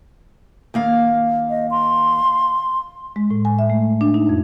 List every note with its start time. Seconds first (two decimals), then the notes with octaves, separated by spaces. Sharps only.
0.74 D#2 A#3 F5
1.50 D#5
1.71 C6
3.16 G#3
3.30 A2
3.45 G#5
3.59 E5
3.70 A3
4.01 D4
4.14 D#4
4.29 F2